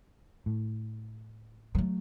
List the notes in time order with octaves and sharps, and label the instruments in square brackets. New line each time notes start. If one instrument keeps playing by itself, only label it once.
[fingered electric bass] A2
[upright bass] F#3 A3